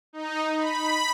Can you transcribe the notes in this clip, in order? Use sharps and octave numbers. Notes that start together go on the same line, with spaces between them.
D#4
B5